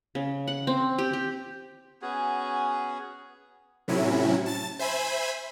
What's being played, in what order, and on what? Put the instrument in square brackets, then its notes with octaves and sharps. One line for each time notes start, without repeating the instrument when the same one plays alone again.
[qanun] C#3
F#5
C4
G4
G4
[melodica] B3 C#4 F#4 G#4
[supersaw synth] A2 C3 F#3 C#4 E4
A5 A6
C5 E5 G#5 B5